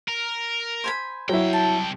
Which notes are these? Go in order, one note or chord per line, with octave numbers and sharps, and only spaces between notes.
A#4
C5 G#5 B5
C2 F#3 E4 G5
A5